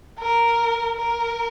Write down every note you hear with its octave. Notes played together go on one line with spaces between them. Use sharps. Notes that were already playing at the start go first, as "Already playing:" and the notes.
A#4
A#4